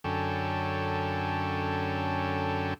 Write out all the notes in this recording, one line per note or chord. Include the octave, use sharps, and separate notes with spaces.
F#2 D3 C#4 A4 G5